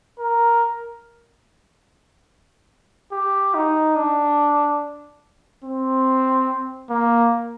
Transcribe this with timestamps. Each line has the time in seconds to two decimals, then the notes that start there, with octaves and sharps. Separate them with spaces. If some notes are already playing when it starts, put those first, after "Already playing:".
0.19 A#4
3.12 G4
3.55 D#4
3.96 D4
5.64 C4
6.90 A#3